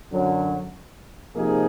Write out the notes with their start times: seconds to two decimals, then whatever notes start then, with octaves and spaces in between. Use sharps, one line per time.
0.11 F#2 D3 F#3
1.34 C3 F3 A#3 D#4 G#4